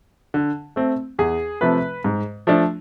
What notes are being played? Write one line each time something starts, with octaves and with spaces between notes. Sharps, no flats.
D3
A3 C4
E2 G#4
C3 F3 A3 B4
G#2
F3 A3 D4